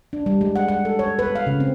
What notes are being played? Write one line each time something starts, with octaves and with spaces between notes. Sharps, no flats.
D4
G3
G#3
F#5
F#5
A4
C#5
B4
F5
C#3
C4